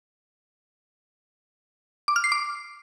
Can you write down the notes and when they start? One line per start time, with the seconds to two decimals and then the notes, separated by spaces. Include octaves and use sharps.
2.08 D6
2.16 F6
2.24 C7
2.32 D6